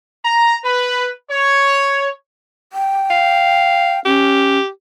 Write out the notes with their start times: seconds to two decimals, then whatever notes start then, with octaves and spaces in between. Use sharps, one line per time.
0.25 A#5
0.65 B4
1.30 C#5
2.73 G5
3.10 F5
4.06 C#4 G4